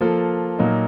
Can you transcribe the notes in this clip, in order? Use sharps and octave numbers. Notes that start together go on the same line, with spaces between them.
F3 A#3 F4 A4
A#2 F#3 A#3 D#4